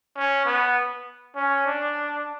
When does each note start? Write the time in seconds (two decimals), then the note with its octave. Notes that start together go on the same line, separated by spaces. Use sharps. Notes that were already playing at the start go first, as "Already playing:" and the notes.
0.16 C#4
0.46 B3
1.36 C#4
1.66 D4